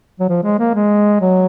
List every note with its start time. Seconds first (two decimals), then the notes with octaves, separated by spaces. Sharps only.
0.20 F#3
0.29 F3
0.43 G#3
0.59 A#3
0.75 G#3
1.21 F#3